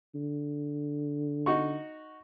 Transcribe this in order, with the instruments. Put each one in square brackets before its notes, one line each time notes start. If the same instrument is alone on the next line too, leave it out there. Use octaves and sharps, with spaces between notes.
[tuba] D3
[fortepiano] D#4 F#4 C#6